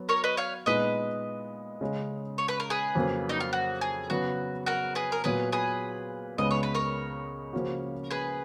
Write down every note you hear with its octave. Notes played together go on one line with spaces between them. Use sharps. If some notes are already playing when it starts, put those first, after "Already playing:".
Already playing: F#3 B3 F#4
A#4 C#5
B4 D#5
C#5 F5
A#2 G#3 B3 D#4 B4 D#5
C#3 G#3 C#4
C#5
B4
A#4
G#4 B4
F2 C#3 F#3 A#3
D#4
F4
F#4
G#4
C#3 F#3 B3 F#4
F#4 A#4
G#4 B4
A#4
A#2 F#3 B3 G#4 B4
G#4 B4
C#2 C#3 G#3 B3 D#5
C#5
B4
A#4 C#5
C#3 F3 A#3 C#4 F#4
G#4 B4